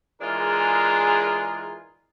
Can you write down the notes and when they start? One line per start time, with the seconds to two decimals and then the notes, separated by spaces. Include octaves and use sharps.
0.22 E3 G#3 D4 F4 G#4 A#4